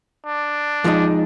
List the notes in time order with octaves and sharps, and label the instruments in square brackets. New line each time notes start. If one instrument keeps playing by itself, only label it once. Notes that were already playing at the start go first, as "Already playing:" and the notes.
[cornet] D4
[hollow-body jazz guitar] F2 F3 G#3 D#4